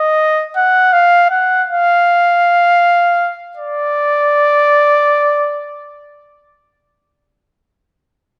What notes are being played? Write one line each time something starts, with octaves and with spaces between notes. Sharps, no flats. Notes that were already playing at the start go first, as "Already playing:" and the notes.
Already playing: D#5
F#5
F5
F#5
F5
D5